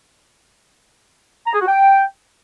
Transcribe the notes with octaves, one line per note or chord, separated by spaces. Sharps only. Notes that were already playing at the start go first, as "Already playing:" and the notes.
A#5
G#4
F#4
G5